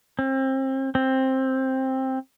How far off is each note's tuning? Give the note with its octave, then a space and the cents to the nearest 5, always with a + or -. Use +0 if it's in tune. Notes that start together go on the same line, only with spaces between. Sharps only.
C4 +30
C4 +10